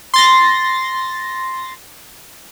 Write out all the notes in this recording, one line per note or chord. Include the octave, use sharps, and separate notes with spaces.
C6 A6 A#6